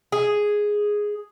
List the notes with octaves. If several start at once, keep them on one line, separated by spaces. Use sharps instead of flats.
G#4